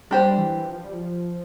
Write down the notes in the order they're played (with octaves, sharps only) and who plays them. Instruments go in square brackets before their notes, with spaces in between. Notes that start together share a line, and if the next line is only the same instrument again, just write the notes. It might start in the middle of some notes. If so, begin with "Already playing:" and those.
[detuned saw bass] G3 [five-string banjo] D4 G4 C5
[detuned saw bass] E3
F3
G3
F3